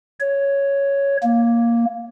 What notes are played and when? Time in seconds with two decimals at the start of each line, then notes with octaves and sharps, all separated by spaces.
0.20 C#5
1.23 A#3